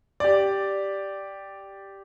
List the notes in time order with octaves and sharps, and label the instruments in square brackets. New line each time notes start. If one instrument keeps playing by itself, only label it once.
[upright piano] G4 D5